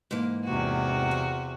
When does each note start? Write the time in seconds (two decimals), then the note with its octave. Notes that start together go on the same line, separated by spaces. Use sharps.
0.11 G#2 E3 A#3
0.44 E2 C3 F#4
1.11 F4